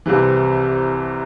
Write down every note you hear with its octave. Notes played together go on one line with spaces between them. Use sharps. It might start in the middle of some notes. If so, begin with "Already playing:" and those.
C2 C3 E3